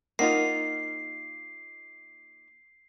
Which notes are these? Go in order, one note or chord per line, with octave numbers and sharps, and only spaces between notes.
A#3 D#4 F4 A#4 F#5 C7